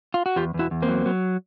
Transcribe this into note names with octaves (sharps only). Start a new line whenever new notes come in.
F4
F#4
E2 F4 G4
E2 E4 F#4
E2
A#3 C4
F#3
F#3